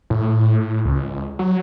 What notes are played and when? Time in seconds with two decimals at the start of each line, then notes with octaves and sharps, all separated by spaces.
0.10 A2
0.85 C#2
1.39 F#3